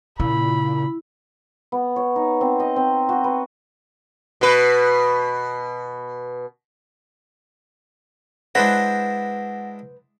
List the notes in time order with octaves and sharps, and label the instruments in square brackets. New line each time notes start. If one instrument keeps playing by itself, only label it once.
[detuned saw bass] A#2 [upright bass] C#3 [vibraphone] E4 [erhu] B5
[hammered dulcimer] B3
C#5
D#4
C4
D#5
C4
F#4
B4
[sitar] B2 B4
[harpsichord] G#3 D4 E4 [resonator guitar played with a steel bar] B4 C5 [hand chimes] F#5 A#6